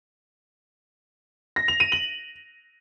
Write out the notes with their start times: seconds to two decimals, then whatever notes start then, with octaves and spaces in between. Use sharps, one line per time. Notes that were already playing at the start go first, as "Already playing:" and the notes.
1.56 A#6
1.68 F7
1.80 D#7
1.92 F#7